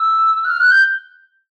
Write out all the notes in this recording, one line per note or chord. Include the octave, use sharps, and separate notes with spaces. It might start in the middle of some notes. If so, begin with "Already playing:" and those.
Already playing: E6
F#6
F6
F#6
G6